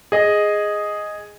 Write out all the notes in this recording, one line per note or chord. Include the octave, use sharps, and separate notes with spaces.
G#4 D#5